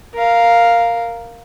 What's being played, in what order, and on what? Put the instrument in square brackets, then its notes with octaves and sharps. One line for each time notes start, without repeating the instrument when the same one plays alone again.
[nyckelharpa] A#4 F5